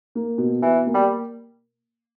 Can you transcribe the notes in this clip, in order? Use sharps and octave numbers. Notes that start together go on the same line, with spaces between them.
A#3
B2
B2 E3
A#3
G3